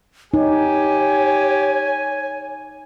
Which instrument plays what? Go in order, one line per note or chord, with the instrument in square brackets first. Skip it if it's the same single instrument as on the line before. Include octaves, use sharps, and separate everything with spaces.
[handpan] D#4 [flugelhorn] G4 [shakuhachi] C#5 [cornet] G#5